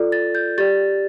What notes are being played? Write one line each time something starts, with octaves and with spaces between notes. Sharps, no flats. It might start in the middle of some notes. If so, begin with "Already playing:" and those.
Already playing: F4 A4 D5
A6
G6
G4 D5 A6